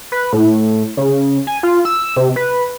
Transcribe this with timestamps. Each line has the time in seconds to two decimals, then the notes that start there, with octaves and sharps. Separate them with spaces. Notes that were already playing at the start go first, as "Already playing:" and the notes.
0.12 B4
0.33 A2
0.97 C#3
1.47 G#5
1.63 F4
1.85 E6
2.17 C3
2.36 B4